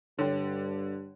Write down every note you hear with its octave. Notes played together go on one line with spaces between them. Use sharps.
G2 D3 C#5 G5